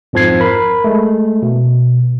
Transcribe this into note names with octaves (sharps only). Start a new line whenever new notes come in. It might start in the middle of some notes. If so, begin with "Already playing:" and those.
F2 G#2 F3 C4 G#6 C7
A#4 B5
G#3 A3
B2